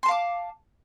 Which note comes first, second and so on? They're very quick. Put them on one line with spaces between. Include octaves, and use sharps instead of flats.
C6 A5 F5 D6